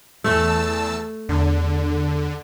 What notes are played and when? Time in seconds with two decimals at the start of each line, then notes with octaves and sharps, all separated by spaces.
0.24 E2 A3 A5 E6
1.29 E2 D3